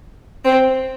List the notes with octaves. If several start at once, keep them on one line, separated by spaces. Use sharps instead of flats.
C4